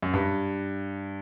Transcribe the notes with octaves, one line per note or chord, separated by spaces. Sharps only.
F#2
G2